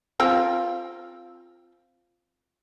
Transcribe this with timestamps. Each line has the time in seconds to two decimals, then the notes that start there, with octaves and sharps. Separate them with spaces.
0.20 C4 F4 G5